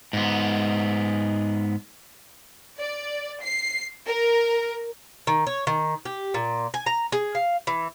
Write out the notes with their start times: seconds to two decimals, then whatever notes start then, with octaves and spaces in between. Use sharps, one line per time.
0.13 G#2 B3
2.79 D5
3.43 C7
4.08 A#4
5.27 D#3
5.47 C#5
5.67 D#3
6.05 G4
6.34 A#2
6.74 G#5
6.86 A#5
7.12 G#4
7.35 F5
7.67 E3